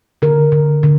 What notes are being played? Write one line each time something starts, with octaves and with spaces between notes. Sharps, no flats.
D3 A#4
D3
D3